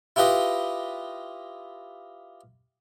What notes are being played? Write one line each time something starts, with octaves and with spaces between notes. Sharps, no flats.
E4 F4 G4 B4 D#5